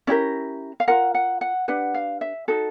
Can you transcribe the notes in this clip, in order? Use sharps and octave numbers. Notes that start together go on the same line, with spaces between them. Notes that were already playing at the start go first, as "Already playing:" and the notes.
C#4 E4 G4 A#4 D5
F5
F4 A#4 F#5
F#5
F#5
D4 G4 B4 F#5
F5
E5
D#4 F#4 A4